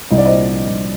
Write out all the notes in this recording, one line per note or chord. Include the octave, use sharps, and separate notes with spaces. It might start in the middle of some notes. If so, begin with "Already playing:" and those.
C2 D#5
D5
A#2 C5 D#5
F3
C2